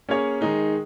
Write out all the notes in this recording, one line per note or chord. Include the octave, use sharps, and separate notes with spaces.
A#3 C#4 G#4 C#5
D#3 G#3 D#4 G#4